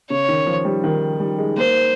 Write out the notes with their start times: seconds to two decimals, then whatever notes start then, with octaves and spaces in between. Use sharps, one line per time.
0.10 C#3 C#5
0.28 D#3
0.46 F3
0.65 G3
0.84 D#3
1.20 G3
1.38 G#3
1.57 A#3 C5